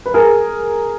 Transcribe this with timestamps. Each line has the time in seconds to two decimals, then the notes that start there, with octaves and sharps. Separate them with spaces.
0.06 B4
0.14 G#4 A#4